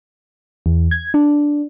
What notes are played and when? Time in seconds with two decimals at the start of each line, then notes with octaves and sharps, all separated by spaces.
0.66 E2
0.91 G#6
1.14 D4